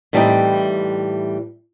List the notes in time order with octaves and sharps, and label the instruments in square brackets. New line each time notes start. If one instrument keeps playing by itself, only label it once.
[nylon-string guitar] A2 E3 G3 C4 D#4 G5